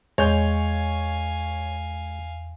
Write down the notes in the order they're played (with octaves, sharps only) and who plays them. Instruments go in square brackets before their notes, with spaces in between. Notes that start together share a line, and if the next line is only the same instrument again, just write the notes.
[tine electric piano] E2 [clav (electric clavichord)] G#3 [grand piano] C#5 G6 [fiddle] F5 G#5